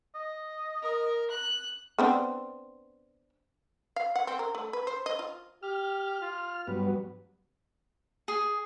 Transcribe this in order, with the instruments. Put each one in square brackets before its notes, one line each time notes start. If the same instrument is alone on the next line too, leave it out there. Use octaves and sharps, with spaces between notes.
[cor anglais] D#5
[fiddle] A#4
F#6
[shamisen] B3 C4 D4
F5
F#5
C4
A#4
A3
B4
C5
D#5
F4
[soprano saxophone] G4 [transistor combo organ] F6
[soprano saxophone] F4
[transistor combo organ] G2 F#3 B3 [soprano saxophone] B4
[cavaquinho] G#4